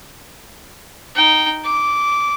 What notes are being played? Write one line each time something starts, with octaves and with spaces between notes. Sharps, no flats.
D#4 G5
D6